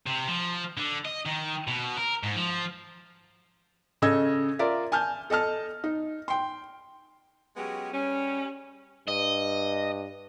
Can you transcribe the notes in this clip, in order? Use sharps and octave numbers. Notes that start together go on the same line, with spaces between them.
C3
F3
D3
D#5
D#3
B2
A#4
G#2
F3
C#3 A4 D#5 E6 G#6
F4 A#4 D5 E5
G#5 A5 F6 G6
A4 D#5 A5 F6
D#4
G5 C6
F#3 G#3 B3 C#4 G4 G#4
G3 C#4
G2 D#5